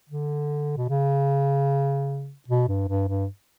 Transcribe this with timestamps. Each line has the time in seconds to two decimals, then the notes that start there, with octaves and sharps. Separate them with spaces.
0.09 D3
0.77 B2
0.89 C#3
2.48 B2
2.68 G2
2.88 G2
3.08 G2